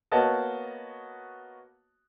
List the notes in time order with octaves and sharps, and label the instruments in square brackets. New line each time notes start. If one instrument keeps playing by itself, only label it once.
[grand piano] A#3 B3 F#4 C#5 D#5 A5